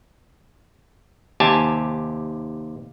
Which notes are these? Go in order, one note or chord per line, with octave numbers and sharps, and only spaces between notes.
D#2 C3 G4 G#5 A5